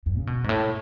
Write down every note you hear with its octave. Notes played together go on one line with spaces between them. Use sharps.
F#2
C#3
B2
G#2
A2